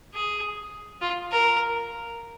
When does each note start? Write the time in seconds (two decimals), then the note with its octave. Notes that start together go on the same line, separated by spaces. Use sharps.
0.14 G#4
1.02 F4
1.31 A#4